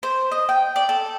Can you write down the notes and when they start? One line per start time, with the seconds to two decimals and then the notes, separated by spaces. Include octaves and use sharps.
0.03 C5
0.32 D#5
0.49 G5
0.76 D5
0.89 A4